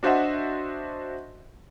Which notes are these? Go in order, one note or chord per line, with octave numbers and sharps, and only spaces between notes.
D4 F#4 C5 D#5 E5 F#5